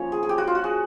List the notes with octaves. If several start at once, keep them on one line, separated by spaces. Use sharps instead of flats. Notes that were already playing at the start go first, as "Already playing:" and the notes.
Already playing: F3 A#3 C#4 C#5
G#4
G#4
G4
F#4
F4
F#4
G#4